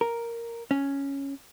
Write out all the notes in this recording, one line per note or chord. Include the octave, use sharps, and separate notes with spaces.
A#4
C#4